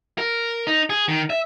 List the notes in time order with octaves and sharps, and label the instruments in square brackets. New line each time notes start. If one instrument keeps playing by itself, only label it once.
[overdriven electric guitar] A#4
D#4
G#4
D#3
E5